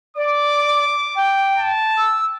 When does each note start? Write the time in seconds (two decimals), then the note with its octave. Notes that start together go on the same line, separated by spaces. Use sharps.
0.16 D5 D6
1.16 G5
1.57 A5
1.98 E6